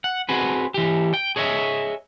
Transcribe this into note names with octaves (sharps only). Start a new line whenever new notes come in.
F#5
C4 F#4 G#4 B4
E3 G4
G5
G#4 C#5 D#5 E5